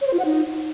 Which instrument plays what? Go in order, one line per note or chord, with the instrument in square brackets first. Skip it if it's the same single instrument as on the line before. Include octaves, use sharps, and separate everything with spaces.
[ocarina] C#5
C5
F4
F#5
D#4